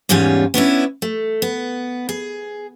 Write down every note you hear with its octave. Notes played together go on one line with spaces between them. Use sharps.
E2 G#2 G3 C#4 F4 G#5
B3 C#4 D4 E4
A3
B3
G#4